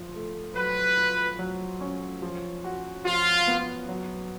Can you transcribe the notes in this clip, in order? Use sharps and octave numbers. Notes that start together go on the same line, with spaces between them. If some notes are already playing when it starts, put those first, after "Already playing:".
Already playing: F3
A3
F#3 B4
F4
F#3
C#4
F3
F#4
F3 F4
B3
F#3